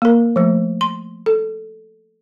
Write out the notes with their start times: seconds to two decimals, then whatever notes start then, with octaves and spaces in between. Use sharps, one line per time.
0.02 A#3 A#4
0.36 F3 A3
0.81 C6
1.26 A4